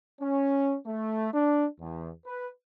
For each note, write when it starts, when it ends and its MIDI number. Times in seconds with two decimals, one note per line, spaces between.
0.21 0.75 61
0.86 1.29 57
1.33 1.66 62
1.79 2.11 40
2.26 2.49 71